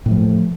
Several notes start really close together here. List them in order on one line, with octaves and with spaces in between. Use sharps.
A2 A3 F3